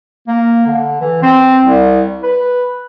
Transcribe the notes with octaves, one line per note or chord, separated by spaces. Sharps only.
A#3
D3
E3
C4
C2
B4